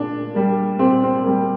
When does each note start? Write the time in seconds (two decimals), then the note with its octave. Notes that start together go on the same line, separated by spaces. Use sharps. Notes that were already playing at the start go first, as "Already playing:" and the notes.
Already playing: A#2 D4
0.34 G3 A#3
0.79 A#2 C4
1.04 C4
1.24 G3 A#3